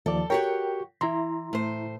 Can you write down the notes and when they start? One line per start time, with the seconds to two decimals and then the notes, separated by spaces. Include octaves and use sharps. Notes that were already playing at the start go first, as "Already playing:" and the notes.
0.06 D#2 F3 A4 D5
0.30 F#4 G4 A#4 C#5 G5
1.01 E3 E4 A#5 C6
1.53 A2 C5